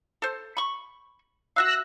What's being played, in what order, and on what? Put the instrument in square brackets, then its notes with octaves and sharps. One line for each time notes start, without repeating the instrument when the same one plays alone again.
[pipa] A4 C5
B5 C#6
[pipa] F#4 E5 F5 [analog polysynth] E6 F#6 A#6